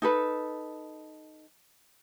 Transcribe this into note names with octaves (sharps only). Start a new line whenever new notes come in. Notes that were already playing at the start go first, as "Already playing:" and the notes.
D#4 A4 B4